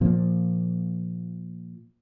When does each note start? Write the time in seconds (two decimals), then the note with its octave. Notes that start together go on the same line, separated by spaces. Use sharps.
0.01 A#2 F3 A#3